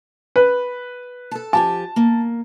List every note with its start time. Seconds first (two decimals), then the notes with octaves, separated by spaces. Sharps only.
0.36 B4
1.31 A4 A5
1.53 F3 G4 G#5 A5
1.96 A#3